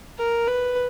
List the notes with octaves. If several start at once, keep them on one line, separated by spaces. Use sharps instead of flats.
A#4
B4